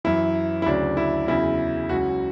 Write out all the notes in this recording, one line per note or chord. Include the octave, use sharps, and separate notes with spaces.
F#2 E3 E4
E4
D2 C#3 F#3 D4
E4
E2 C#3 F#3 E4
C#2 C#3 F#3 F#4